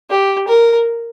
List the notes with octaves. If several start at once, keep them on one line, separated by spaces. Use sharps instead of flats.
G4
A#4